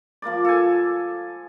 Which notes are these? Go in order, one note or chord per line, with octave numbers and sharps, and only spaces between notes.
F3 A#3 A#4 D5
A4 G#5